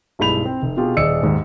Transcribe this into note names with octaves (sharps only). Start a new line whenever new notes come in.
B1 G2 G#3 E4 B5 F7
C4
F1
B2 F4 G4 G#4
D#1 G#4 D5 D#5 E6 C#7
D#2 G#2